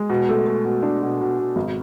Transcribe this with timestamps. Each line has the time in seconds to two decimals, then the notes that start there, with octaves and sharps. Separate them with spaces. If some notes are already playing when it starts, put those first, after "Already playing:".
Already playing: G#3
0.09 B2
0.29 A3
0.46 A3
0.65 B2
0.83 D4
1.02 B2
1.20 B2
1.39 B2
1.56 G#1